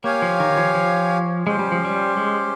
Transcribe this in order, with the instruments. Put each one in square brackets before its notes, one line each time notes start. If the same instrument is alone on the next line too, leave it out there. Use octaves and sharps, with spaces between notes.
[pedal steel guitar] A#3 [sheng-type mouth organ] G4 C#5 F5 G#5
[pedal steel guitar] F3
D#3
F3
F3
[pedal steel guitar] G#3 [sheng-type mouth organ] C#4 G4 C5
[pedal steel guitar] G3
F3
G3
G#3